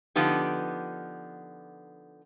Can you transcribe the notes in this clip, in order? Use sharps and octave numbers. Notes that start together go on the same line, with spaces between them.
D3 F3 B3 D#4 G4